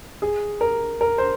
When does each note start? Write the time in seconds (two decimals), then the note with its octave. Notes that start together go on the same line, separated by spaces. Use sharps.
0.22 G#4
0.61 A#4
1.01 A#4
1.18 C5